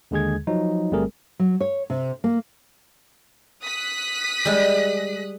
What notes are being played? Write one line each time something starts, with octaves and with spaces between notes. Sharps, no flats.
D#2 D3 G#3 G#4 G#6
F3 F#3 D#4
G1 G3 A3 C4 G#4 A#4
F#3
C#5
C3
A#3
D#6 F#6 B6
G3 G#3